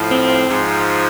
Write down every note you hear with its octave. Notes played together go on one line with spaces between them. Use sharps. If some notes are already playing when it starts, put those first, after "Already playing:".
Already playing: A2 F3
C4
G#2 F3